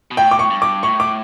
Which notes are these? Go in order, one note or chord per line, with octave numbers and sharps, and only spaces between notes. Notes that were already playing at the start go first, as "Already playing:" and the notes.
B2
A2 G5
D6
C#6
G2
D6
A2 C#6
D6